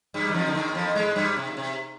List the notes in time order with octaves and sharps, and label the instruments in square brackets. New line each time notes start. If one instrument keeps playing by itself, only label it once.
[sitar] G2 G3
D#3
F2 F3
D3
D#2 D#3
F2 F3
G#2 G#3
G2 G3
C3
A#2
C3